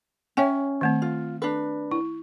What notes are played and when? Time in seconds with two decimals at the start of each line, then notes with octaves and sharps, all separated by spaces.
0.37 C#4 C#5 E5 G5 G#5
0.81 D#3 A3 C4
1.02 F4
1.42 D4 B4
1.91 E4